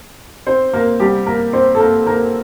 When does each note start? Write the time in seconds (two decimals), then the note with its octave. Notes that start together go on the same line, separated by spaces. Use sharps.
0.47 C4 C5
0.73 A#3 A#4
1.00 C2 C3 G3 G4
1.26 A#3 A#4
1.53 C4 C5
1.75 A4
1.80 A#3 A#4
2.07 A#3 A#4